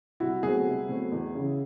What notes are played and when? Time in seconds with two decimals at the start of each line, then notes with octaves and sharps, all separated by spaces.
0.20 C2 E4 F#4
0.43 B2 F#3 A3 C4 F#4 G#4
0.66 C2
0.89 B2 F#3 A3 C4
1.12 E2
1.35 C#3 E3